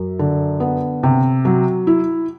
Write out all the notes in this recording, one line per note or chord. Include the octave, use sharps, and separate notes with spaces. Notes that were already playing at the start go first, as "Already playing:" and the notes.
Already playing: F#2
D3
B3
C3
F#3
E4